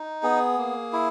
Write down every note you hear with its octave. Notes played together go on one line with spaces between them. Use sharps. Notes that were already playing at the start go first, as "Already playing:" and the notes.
Already playing: D#4
B3 G#4
A#3
E4